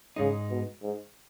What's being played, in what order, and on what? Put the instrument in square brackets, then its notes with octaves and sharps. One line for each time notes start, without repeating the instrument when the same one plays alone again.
[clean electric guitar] G#2 G#3 D#4 [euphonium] C#3
[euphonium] B2
G#2